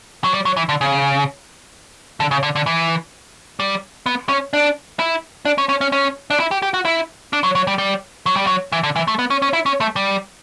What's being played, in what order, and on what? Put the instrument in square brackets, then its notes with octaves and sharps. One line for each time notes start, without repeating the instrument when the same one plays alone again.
[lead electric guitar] F#3
G3
F#3
E3
D3
C#3
D3
C#3
D3
D3
E3
G3
B3
C#4
D4
E4
D4
C#4
C#4
C#4
C#4
D4
E4
G4
G4
F#4
E4
D4
F#3
F#3
G3
G3
F#3
G3
F#3
E3
D3
E3
A3
B3
C#4
C#4
E4
C#4
A3
G3